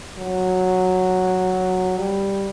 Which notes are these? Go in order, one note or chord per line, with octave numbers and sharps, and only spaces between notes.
F#3
G3